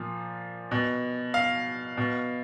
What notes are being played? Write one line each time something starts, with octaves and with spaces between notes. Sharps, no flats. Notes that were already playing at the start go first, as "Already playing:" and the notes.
Already playing: A#2 F3
B2
F5
B2